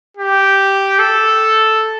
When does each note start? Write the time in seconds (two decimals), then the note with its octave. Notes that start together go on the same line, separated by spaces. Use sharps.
0.17 G4
0.99 A4